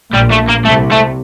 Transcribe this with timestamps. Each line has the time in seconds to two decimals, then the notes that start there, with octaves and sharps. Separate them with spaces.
0.13 A#1 A#2 G3
0.31 A3
0.48 A#3
0.65 C2 C3 A3
0.91 A3